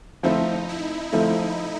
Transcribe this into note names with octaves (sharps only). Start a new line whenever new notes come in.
F3 A3 C4 D#4 E4 A4
E4
F3 A3 C4 D#4 E4 A4